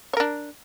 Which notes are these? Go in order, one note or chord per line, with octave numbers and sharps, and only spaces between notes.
D4 A#4 C#5